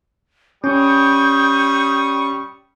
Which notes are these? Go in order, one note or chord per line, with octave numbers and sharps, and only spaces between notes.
G3 C#4 C#6 D#6 G6